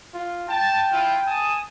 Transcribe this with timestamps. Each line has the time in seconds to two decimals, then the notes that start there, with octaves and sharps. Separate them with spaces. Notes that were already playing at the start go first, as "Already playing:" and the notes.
0.14 F4
0.49 G5 A5
0.92 E4 F4
1.27 G#5 A5 D#6